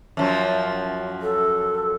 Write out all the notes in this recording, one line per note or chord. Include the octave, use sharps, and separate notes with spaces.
F#2 F3 F#3
A4